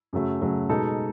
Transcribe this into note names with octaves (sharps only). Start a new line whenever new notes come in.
F#2 C#3 F#3 A3
F#2 C#3 F#3 A3
B2 G#3 D#4 A4